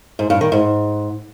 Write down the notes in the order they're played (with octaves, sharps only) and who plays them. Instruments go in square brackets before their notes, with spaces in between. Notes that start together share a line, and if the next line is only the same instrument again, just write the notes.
[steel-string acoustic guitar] G#2
G2
D#3
G#2